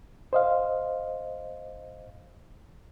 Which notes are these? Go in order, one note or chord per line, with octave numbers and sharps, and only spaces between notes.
C5 D#5 F5